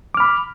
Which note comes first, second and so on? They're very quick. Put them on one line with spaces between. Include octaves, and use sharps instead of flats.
D6 F6 B5